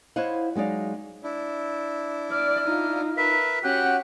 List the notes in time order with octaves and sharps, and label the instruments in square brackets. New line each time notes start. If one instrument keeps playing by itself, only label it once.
[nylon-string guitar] E4 C5 C#5 D#5 F5 F#5
F#3 G#3 D#4 D5 F5
[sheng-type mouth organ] D4 E4
[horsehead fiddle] D5 [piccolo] F6
[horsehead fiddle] D#4 F4
[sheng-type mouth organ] A#4 B4 E5 [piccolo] B6
[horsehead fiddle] C#4 F#5 [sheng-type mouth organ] F#4 G4 G5 [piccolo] F#6